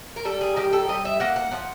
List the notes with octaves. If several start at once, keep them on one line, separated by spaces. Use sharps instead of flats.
A#4
G3 A4
G#4
D#3 G4
A4
G3 D#5
E5
A#3 F#5
F#5
F3 F#5